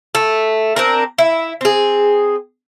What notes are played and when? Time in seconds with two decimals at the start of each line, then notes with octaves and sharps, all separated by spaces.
0.15 A3
0.76 C4 D4 A#4
1.18 E4
1.61 C4 G#4